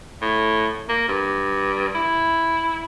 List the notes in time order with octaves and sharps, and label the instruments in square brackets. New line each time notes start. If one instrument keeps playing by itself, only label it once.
[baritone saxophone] A2
A#3
G2
E4